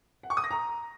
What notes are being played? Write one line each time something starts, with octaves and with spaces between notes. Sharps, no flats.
F#5
C#6
D#6
A#6
A#5